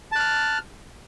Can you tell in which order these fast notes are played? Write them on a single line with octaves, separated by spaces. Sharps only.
A5 F#6 F6